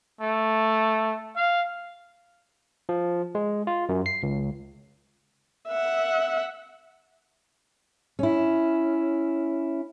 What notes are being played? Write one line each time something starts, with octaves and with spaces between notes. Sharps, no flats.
A3
F5
F3
G#3
F4
F#2
C7
C#2
E5 F#5
C#4 E4